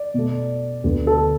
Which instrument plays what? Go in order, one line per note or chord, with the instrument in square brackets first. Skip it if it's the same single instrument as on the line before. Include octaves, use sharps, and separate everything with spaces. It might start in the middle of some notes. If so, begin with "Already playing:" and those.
Already playing: [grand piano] D5
B2 A3
D2 D3 B3
A4